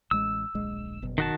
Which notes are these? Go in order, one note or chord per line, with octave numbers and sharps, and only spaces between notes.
A1 G#3 E6
D1 A#1 G#3
F#1 B2
D#3 F#4 A5